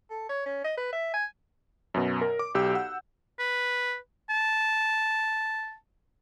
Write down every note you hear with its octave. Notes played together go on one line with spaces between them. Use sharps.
A4
C#5
C#4
D#5
B4
E5
G#5
F#2 B2
A#4
D6
B1 G4 E6 G6
F#5 E6
B4
A5